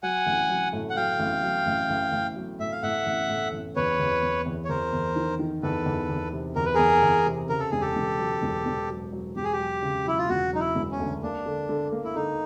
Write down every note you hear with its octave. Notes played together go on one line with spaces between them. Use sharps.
F#3 F#5 G#5
A1
F#3
A2
F#5
F#3 F5 G5
A1
F#3
A1
A1
A1
F#3
A2 E5
F5
A2 E5 F#5
A1
A2
A1
E2 B4 C#5
E2
E2
E2
C#5
E2 A#4 C5
E2
D#3
D#3
E2 A4 B4
E2
E2
C3
E2 A#4
B4
E2 G#4 A#4
E2
C3
C#3 A#4
A4
E1 G#4
G4 A4
E1
F#3
E1
E1
F#3
F#3
E1 G4
G#4
G4
F#3
C#3
F#3 E4
F4
E1 F#4
F#3 D#4
E4
E1
C#4
D2
A#3 D4
D3
D3
A#3
E4
D3 D#4